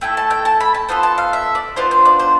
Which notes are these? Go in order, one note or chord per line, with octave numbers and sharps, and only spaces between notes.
A3 E4 A4 G5
A5
G5
A5
B5
A5
B3 F4 A4 C5
A5
F5
E5
D5
B3 D4 F4 C5
C5
D5
C5